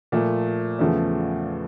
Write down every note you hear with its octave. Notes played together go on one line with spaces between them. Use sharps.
A#2 F3 A3
E2 C#3 F3 A3